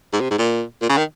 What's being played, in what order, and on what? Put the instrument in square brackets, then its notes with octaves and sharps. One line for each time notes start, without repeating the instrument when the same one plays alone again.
[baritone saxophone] G#2
C3
G#2
A#2
A#2
C#3
D#3